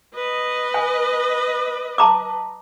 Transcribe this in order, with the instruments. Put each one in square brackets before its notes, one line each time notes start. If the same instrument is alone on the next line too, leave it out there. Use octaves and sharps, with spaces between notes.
[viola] B4 D#5
[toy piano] G#5
A5 A#5 D6